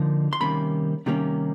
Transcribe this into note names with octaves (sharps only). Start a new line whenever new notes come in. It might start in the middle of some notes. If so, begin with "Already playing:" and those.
Already playing: D3 F3 A#3 D#4
C6
C3 D#3 G3 A#3 C#4 B5
C3 D#3 G3 A#3 C#4